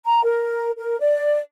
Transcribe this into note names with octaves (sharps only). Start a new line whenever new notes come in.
A#5
A#4
A#4
D5